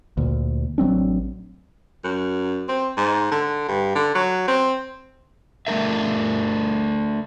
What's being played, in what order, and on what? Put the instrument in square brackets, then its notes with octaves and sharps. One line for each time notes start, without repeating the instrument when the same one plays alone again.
[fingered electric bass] D2 A#2
A1 F#3 C4 D4
[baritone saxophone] F#2
C4
G#2
D3
G2
D3
F#3
C4
[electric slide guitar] A3 D4 A#4 E5